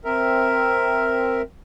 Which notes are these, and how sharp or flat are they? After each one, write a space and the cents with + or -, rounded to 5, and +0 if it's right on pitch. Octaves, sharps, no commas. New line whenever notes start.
C4 +0 A#4 +0 E5 +0